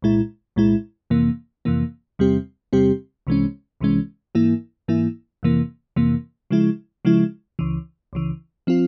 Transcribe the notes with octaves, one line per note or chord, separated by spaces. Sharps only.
C2 A#2 G#3 E4
C2 A#2 G#3 E4
F2 C3 E3 A#3
F2 C3 E3 A#3
E2 C3 G3 C4 G4
E2 C3 G3 C4 G4
C2 C3 E3 G#3 C#4
C2 C3 E3 G#3 C#4
G#2 E3 A#3 E4
G#2 E3 A#3 E4
F2 C3 E3 A#3
F2 C3 E3 A#3
C#3 F3 G#3 E4
C#3 F3 G#3 E4
C#2 C#3 E3
C#2 C#3 E3
F3 C4 F4